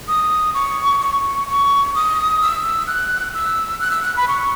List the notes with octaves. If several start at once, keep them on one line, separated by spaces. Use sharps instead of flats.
D#6
C#6
C#6
C#6
D#6
E6
F#6
E6
F#6
E6
F#6
B5
C#6